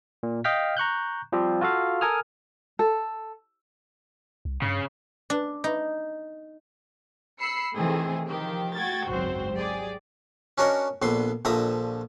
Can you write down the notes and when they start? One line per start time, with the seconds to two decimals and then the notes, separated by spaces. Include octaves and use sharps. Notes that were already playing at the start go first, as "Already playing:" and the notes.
0.23 A#2
0.44 D#5 F5 G5 F6 B6
0.77 A#5 C#6 F#6 G6
1.32 F3 G3 C4 F4 G4
1.61 F4 F#4 A4 F5
2.01 A4 A#4 G#5 D#6 F6
2.79 A4
4.45 C2
4.62 G2 C#3
5.30 D4
5.64 D#4
7.39 B5 E6 C7 C#7
7.74 C3 D#3 E3 A3 C4 G#4
8.28 D#3 F3 G4
8.76 A3 F#4 G5 G#6 A6
9.09 G#1 C#2 F#2 C4 F#4 C5
9.53 F#3 G4 G#4 D5
10.58 C#4 D4 F#4 A#4 C#5 D#5
11.02 A#1 D3 B3 C6
11.45 A#1 D3 F3 E5 A#5 D#6